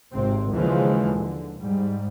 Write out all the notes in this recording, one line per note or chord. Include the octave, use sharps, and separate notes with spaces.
G#1 C3 C4
D#2 C#3 E3 F3 G#3
D3
G#2 G3